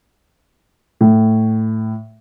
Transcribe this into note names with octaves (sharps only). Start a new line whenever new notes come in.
A2